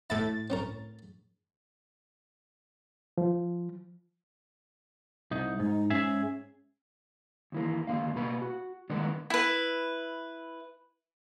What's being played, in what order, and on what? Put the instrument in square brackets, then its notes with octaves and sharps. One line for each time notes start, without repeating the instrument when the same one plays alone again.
[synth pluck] A2 A6 [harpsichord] E4 A4 E5
[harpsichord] C4 C#4 A#4
[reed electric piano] F3
[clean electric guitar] C2 D#4
[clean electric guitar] G#2 [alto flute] D#4
[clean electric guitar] G#2 G#4 E5 [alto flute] C#4
[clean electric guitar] D#2 E3 A#3
D#2 B2 D3 A#3 F5
B2 A#3 B4 B5
F#4
D3 D#3 G#3 A#3 B3 D4
[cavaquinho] E4 B4